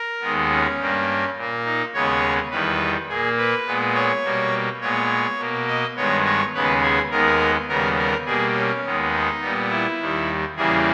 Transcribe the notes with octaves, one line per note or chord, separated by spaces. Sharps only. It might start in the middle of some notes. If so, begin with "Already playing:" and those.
Already playing: A#4
D#2 D#3 G#3 B3
C#4
G2 G3 A#3
A#2 A#3
D#4
D#2 C#3 G#3 B3 C#5
E2 D#3 G3 B4
A#2 A#3 G#4
B4
A#2 G#3 B3
C#5
B2 G3 A#3
A#2 G#3 B3 C#5
B2 A#3
D#5
G2 D#3 G#3 B3 C#5
C#5
D#2 C#3 G#3 B3 B4
G#4
D#2 D#3 G#3 B3 A#4
D#2 C#3 G3 B3 A#4
A#4
B2 G3 A#3 G#4
C#4
D#2 D#3 G#3 B3
D#4
A#2 G3 B3
E4
D#2 D#3 G3
E2 C#3 E3 G3 A#3 G#4